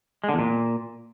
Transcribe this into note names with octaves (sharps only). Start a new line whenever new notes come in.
G#3
D3
E2
A#2